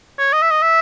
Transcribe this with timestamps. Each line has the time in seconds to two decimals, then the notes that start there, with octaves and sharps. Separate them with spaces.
0.19 C#5
0.33 D#5
0.42 E5
0.51 D#5
0.62 E5